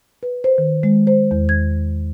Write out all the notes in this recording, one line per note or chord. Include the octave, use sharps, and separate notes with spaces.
B4
C5
D#3
G#3
C5
E2
G#6